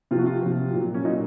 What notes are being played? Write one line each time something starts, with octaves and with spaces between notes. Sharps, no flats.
C3 F3 F4
F#4
F4
C3 F3
A#2 F#3
C#4
A#2 F#3 D#4